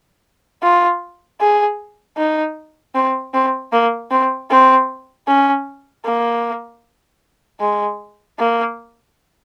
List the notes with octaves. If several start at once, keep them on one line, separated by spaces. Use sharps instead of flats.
F4
G#4
D#4
C4
C4
A#3
C4
C4
C#4
A#3
G#3
A#3